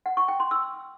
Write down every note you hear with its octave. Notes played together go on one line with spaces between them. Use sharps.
F#5
C#6
G5
C6
E6